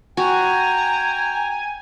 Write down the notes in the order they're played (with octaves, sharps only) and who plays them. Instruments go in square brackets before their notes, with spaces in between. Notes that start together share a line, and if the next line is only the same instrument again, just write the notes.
[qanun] F#4 [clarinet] G5 [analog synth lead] G#5 [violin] A#5